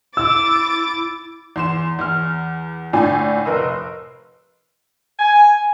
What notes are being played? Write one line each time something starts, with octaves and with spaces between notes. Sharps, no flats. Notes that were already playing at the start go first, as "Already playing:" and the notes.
E4 D6 E6 A6
E2 C6 E7
E2 F6
A2 D3 D5 G#5
F1 A#4 B4 D#5 E6
G#5